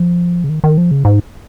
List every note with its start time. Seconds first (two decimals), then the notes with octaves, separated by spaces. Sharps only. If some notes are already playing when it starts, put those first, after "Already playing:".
Already playing: F3
0.44 C#3
0.49 D#3
0.64 D#3
0.78 F3
0.91 C#3
1.05 G#2